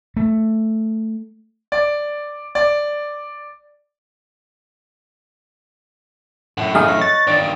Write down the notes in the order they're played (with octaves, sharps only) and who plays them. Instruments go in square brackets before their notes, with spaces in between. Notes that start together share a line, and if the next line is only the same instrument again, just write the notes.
[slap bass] A3
[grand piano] D5
D5
[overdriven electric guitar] F#2 A2 [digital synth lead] F#5
[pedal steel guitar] D#4 G#4 A4 [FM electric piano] F5
[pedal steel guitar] C#5 D#5 C#6 [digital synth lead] F#6
[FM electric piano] A6
[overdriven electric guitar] G2 D#3 [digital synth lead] D5